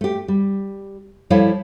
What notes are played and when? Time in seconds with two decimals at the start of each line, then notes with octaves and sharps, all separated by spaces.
0.01 A3 G4
0.28 G3
1.30 F3 G3 E4 A4 C#5 F5